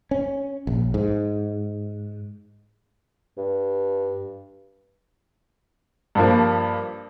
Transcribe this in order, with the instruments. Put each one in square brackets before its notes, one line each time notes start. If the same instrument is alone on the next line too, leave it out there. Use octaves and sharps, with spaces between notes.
[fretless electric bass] C#4
A#1
G#2
[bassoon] G2
[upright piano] G2 F3 A#3